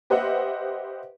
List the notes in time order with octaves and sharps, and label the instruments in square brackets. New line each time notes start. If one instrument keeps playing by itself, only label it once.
[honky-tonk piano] G4 B4 C5 D#5 E5 F#5